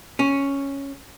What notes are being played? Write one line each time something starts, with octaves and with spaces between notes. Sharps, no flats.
C#4